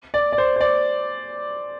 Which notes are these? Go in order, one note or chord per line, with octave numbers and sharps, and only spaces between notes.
D5
D5
C5
C5
D5